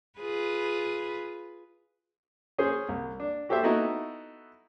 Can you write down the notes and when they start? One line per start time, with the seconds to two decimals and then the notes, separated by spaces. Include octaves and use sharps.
0.20 F4 G#4 B4
2.58 C#4 G#4 C5
2.89 C2
3.20 D4
3.49 F#4 G4 A4 C5 E5
3.63 B3 D#4 E4 F#4 A4